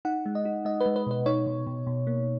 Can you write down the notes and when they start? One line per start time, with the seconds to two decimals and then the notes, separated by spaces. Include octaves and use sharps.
0.05 D#4 F#5
0.26 G#3
0.35 D#5
0.45 D#4
0.65 G#3 D#5
0.81 B4
0.86 G#3
0.96 B4
1.07 B2 B4
1.26 D#4 C#5
1.47 B2
1.67 B2
1.87 B2
2.07 A#3